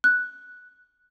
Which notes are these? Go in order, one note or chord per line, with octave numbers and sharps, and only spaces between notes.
F#6